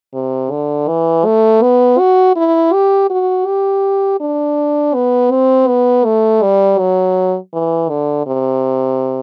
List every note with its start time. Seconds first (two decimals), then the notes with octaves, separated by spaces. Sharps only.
0.14 C3
0.51 D3
0.88 E3
1.25 A3
1.62 B3
1.99 F#4
2.36 E4
2.73 G4
3.10 F#4
3.47 G4
4.20 D4
4.95 B3
5.31 C4
5.68 B3
6.05 A3
6.42 G3
6.79 F#3
7.53 E3
7.90 D3
8.27 C3